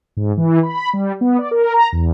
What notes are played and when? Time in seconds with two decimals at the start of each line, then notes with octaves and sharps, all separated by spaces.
0.17 G#2
0.37 E3
0.63 B5
0.93 G3
1.21 B3
1.39 D5
1.51 A#4
1.73 A#5
1.92 E2